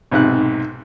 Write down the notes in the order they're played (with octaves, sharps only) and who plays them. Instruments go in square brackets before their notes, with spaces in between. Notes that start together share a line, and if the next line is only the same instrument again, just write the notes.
[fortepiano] B1 G#2 C3 F#6